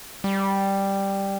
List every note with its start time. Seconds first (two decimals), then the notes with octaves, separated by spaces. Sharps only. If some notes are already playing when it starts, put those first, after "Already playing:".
0.24 G3